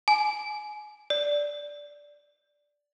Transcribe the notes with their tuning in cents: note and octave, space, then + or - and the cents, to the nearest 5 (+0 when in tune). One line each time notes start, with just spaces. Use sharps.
G#5 +25
D5 -5